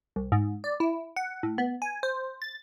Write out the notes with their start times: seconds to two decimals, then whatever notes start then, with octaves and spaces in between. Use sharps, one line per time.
0.16 C2
0.32 G#2
0.64 D5
0.80 E4
1.16 F#5
1.43 A2
1.58 B3
1.82 G#5
2.03 C5
2.42 A6